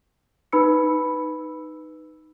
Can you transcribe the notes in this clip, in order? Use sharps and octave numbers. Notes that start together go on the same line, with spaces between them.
D#4 B4 B5 E6 C#7